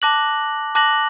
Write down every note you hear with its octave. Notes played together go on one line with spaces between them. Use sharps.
A5 D6 F#6 A#6 F#7
A5 D6 F#6 A#6 F#7